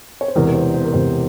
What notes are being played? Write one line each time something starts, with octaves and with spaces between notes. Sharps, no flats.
C#5
C5
E1 E2 C3 A#4
A#4
C5
C5
A#4
E1 E2 C3 C5